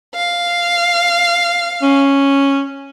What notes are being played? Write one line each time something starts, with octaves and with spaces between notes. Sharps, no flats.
F5
C#4